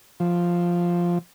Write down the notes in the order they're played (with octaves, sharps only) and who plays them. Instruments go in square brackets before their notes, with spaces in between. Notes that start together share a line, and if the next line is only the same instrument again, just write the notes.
[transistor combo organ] F3